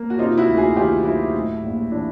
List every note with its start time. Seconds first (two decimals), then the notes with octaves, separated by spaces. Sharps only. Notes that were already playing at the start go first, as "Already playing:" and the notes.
Already playing: A#3
0.10 F#4
0.19 C3 D#4 F4
0.37 E4 F#4
0.47 D2
0.57 F#4 G#4
0.76 D#3 F4 G4
1.05 F#3 E4 F#4
1.34 A2
1.63 A#1
1.91 E3 D4 E4